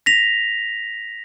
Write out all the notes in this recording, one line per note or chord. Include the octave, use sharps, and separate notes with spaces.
A#6 B6 F7